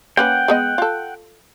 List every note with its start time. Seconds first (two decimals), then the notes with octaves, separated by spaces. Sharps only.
0.17 A#3 C#4 B4 F#5 G5
0.48 G#3 B3 D#5
0.78 F4 A4